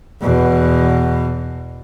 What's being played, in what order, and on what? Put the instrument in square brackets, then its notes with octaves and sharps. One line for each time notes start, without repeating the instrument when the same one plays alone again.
[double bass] E2 B2